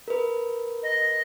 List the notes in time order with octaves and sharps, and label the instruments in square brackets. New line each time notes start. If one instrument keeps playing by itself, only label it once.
[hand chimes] A#4 B4
[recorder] D#5